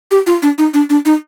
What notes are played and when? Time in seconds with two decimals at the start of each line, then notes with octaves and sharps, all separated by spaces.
0.11 G4
0.27 F4
0.42 D4
0.58 D#4
0.74 D4
0.90 D4
1.05 D#4